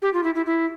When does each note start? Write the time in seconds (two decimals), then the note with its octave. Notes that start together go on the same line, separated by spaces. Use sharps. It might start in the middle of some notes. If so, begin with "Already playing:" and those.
0.02 G4
0.14 F4
0.24 E4
0.35 E4
0.46 E4